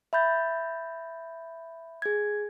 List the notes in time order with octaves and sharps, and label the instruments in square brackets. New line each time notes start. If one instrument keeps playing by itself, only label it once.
[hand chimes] E5 B5 G6 A6
G#4 G#6